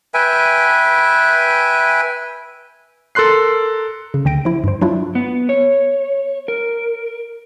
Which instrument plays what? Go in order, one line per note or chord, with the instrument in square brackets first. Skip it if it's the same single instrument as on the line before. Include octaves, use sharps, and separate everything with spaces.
[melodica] B4 E5 G5 G#5
[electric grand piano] A4 A#4 C6 F#6 C7
[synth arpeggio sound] C#3
D2 D3 G5 A#6 D7
F3 E4
G2 C5
F#3 D4 E4 F4
[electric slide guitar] B3
C#5
A#4